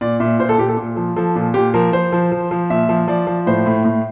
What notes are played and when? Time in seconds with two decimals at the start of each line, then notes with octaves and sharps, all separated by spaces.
0.01 A#2 D5
0.20 A#2 E5
0.39 A#2 C5
0.49 A4
0.58 A#2 G4
0.69 A4
0.77 A#2
0.97 F3
1.16 F3 A4
1.36 A#2
1.54 A#2 G4
1.74 F3 A#4
1.92 F3 C5
2.12 F3
2.32 F3
2.51 F3
2.70 A#2 E5
2.89 F3
3.08 F3 D5
3.27 F3
3.46 A2 C5
3.66 A2
3.84 A2